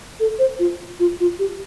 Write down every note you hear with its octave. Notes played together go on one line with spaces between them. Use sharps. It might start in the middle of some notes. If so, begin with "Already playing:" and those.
A4
C5
F4
F4
F4
G4